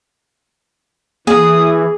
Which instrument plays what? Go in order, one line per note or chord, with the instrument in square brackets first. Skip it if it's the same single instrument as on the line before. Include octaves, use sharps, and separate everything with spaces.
[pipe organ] E3 [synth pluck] A#3 [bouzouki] G#4 [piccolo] D#6